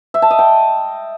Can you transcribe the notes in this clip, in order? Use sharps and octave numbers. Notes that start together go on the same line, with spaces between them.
E5
A5
D#5
G5